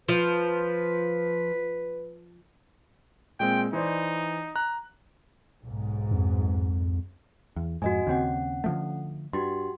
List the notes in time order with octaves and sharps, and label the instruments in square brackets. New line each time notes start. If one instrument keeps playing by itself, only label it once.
[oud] F3 [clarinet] B4
[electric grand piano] A#2 G#3 C4 [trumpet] G5
[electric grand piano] E3 C5 D5 [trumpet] D#4
[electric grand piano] A#5 F#6
[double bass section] B1 G#2
[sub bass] F2
[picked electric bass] E2
[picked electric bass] F2 G#2 [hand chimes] F#4 D#5 G#5
[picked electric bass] D#2 C#3 C4 [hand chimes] C#4 F#5
[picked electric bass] D3 F3 A3
[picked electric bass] G2 [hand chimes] F#4 G4 C6